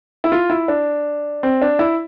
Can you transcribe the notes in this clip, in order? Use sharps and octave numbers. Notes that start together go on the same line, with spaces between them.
E4
F4
E4
D4
C4
D4
E4